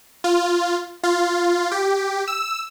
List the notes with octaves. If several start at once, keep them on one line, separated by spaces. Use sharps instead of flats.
F4
F4
G4
E6